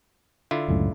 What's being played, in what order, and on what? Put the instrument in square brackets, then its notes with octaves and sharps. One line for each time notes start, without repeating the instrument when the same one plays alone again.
[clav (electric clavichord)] D3 E4 F4
[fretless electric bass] C#2 F#2 A2